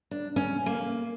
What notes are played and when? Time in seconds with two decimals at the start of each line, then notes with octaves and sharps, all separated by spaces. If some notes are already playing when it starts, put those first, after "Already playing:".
0.11 D4
0.36 C#4
0.66 A#3